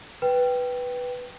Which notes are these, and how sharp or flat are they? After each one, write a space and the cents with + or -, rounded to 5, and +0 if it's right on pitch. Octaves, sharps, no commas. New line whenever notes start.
B4 +0 G5 -5